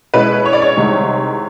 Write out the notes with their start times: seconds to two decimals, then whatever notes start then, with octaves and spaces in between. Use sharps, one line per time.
0.14 B2 G#3 C#4 E4 B4
0.45 C#5
0.53 D5
0.62 C#5
0.76 C2 C3 D#3 G#3